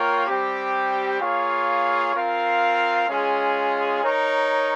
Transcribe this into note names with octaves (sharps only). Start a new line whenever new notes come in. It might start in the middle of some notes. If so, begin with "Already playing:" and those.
Already playing: A#3 F4 A#4 C#5 G5
G3 C4 G4
A#3 F4 G#4 C#5 F5
C4 F4 A#4 F5
G#3 C#4 F4 G#4
D#4 A#4 C#5